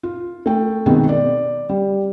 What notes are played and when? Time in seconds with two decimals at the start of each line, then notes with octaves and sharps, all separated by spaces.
0.03 F4
0.46 A3 G5
0.86 B2 D#3 G#3 B3 C4
1.09 D5
1.69 G3